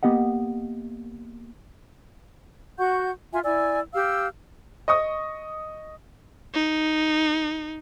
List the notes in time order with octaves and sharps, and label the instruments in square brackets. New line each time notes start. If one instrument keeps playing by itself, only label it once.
[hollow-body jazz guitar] A#3 B3 G4 D#5 F#5
[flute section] F#4 F#5 C#6 G6
F4 E5 G#5 C6
E4 D5 G#5 E6
G4 F5 E6 F6
[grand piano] D#5 C#6 D#6
[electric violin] D#4